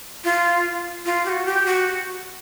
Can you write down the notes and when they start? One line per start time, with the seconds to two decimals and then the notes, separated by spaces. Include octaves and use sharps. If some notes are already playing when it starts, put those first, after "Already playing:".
0.24 F4
1.06 F4
1.26 G4
1.29 F#4
1.46 G4
1.66 F#4